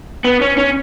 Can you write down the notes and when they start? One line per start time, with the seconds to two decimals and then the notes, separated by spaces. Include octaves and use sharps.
0.24 B3
0.41 C#4
0.58 C#4